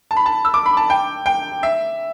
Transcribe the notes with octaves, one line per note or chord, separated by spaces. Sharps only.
A5
B5
A5
E6
D6
B5
A5
G5
G5
E5